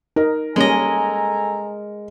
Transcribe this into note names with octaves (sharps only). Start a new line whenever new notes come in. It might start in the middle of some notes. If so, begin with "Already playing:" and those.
D#4 A#4
G3 G#3 A#3 C#4 A4 D#5 G#5 A#5